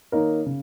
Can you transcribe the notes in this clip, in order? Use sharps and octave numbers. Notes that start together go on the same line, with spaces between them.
D#3 A#3 D#4 A#4 C#5
C#3